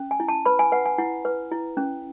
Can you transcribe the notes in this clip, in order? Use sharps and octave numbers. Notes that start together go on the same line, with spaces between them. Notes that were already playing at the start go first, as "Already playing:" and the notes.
Already playing: C#4
G#5
E4
A5
B4 B5
G#5
B4 F#5
G#5
E4 F#5
B4
E4
C#4